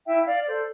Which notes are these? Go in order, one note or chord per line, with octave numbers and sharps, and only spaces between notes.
E4 E5 G5
D5 F5
A4 C5 D5